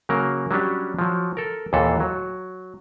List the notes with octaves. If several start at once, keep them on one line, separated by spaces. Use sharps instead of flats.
C#3 F#3 A#3 A#4
F#3 G3 C#4 D4 G4
F3 F#3
A4 A#4
D#2 A#2 E3 A4
F#3